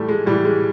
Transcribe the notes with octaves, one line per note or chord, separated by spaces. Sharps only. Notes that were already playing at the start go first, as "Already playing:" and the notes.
Already playing: A2 E3 G3 A3
G#3
A2 E3 G3
G#3